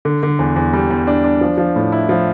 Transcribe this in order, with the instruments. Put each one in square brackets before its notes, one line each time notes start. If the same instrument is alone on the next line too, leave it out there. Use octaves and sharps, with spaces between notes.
[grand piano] D3
D3
E2
E2
G3
E2
D4
D4
F3
F3
A2
E4
F3